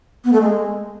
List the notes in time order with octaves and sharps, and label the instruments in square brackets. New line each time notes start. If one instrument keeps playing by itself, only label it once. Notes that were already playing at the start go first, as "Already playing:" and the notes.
[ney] B3
A3
G#3